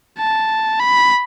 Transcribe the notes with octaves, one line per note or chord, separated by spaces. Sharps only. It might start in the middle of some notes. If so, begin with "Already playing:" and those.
A5
B5